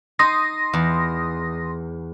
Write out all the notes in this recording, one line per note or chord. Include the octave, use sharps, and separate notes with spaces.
D#4 C6 D#6 A#6
E2